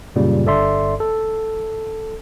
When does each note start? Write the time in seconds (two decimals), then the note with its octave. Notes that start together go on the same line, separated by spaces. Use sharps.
0.16 F#2 A#2 C#3 G3
0.45 G1 G2 A4 D5 E5 C6
1.00 A4